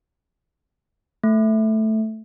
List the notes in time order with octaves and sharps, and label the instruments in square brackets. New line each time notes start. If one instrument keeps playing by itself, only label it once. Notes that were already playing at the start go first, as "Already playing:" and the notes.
[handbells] A3